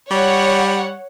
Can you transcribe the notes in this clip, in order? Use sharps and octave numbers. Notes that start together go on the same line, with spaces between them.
G3 C#5 F#5